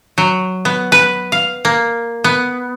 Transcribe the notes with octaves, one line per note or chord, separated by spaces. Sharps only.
F#3
B3
B4
F5
A#3
B3